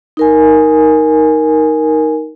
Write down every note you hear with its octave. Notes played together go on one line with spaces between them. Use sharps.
D#4 A#4 G#5